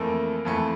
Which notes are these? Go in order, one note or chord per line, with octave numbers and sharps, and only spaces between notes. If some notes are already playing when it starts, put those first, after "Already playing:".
Already playing: F2 E3 A3 A#3 A#4
F2 E3 A3